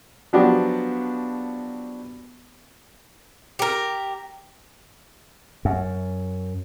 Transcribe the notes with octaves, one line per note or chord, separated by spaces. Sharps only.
F3 F#3 B3 D4 F#4 G4
G4 A#4
F#2